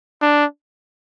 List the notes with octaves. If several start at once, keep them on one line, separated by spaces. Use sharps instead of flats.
D4